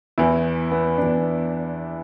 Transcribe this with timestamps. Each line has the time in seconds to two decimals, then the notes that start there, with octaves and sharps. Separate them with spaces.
0.18 E2 E3 E4
0.71 B3
0.97 E2 E3 D4